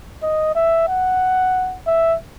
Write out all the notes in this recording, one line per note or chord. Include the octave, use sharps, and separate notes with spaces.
D#5
E5
F#5
E5